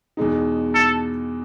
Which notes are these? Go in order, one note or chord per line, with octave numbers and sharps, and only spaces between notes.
E2 B2 G#3 D#4
A4